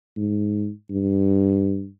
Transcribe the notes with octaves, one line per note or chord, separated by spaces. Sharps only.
G#2
G2